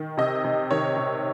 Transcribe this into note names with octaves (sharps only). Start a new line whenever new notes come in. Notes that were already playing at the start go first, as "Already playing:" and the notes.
Already playing: D#3
C3 D#5
C3
D#3 C#5
C3